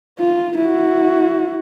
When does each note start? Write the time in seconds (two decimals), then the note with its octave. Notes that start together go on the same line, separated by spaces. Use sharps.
0.19 F4
0.58 E4 F#4